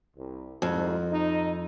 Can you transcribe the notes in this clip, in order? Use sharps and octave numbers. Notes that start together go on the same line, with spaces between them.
C2
C2 F2 G#2
D#4